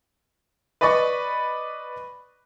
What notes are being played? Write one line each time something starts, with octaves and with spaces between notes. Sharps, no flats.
B4 D5 D#5 B5 C#6